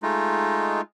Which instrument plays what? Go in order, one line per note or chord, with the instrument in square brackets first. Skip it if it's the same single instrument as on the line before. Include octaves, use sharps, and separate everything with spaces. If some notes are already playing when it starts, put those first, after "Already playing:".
[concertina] G#3 A3 D#4 F4